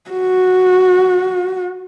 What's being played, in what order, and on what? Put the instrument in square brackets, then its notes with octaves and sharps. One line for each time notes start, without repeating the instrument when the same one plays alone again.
[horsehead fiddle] F#4